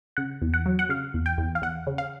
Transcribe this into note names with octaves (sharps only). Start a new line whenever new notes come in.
C#3 F#5
E2
F#5
F#3
F#5
C#3 F5
E2
G5
E2
F5
E2 F#5
C#3
F5